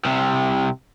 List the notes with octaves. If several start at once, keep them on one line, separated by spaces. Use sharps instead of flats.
C2 C3